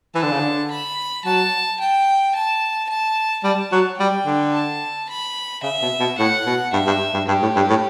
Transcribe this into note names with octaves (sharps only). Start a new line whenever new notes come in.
E3 A5
D3
C#3
D3
B5
F#3 A5
G5
A5
A5
G3 A5
F#3
G3 G5
D3
A5
B5
C#3 E5
B2
B2
A2 F#5
B2
G2 E5
G2
G2
G2 G4
A2
G2
A2